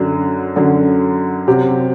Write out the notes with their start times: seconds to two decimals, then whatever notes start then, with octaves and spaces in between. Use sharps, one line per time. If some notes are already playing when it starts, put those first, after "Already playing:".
Already playing: F#2 D3 F#3
0.56 F#2 D3 F#3
1.47 C3 F#3 C4 G4